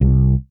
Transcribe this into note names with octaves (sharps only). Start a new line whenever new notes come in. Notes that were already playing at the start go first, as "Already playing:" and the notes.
C2